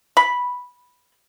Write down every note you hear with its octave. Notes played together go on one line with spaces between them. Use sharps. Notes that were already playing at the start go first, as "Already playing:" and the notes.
B5